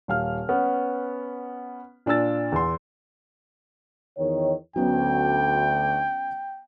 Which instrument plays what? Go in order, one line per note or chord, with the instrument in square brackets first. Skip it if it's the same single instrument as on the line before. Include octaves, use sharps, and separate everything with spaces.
[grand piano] D#1 F5 F6
B3 C#4
A#2 D4 F4 E6 A6
E2 C6
[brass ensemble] E2 D#3 C#5
[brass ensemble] D2 [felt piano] F#3 B3 C#4 [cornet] G5